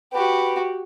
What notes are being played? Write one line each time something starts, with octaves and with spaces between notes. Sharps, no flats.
F#4 G4 B4